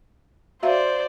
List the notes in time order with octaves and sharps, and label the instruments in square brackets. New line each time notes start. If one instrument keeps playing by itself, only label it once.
[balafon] F#4 E5 F5 [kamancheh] C5 D5